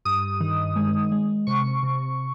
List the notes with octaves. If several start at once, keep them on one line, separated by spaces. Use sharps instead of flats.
G2 D#6
D#3
G#3
G#3
C3 C#6
C3